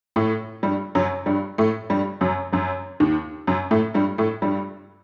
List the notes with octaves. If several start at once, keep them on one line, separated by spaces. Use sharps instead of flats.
A2 A3
G2 G3
F#2 F#3
G2 G3
A2 A3
G2 G3
F#2 F#3
F#2 F#3
D#2 D#3
F#2 F#3
A2 A3
G2 G3
A2 A3
G2 G3